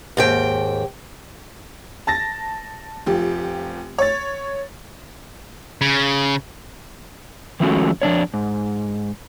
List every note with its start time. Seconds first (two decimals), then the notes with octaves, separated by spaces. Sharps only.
0.17 D#2 G#2 G5
2.07 A5 A6 A#6
3.06 F1 F3 G4
3.98 C#5 A6
5.81 C#3
7.60 D#3 F3 G#3 A3 C#4 F#4
8.02 F2 F3 D4 C#5
8.34 G#2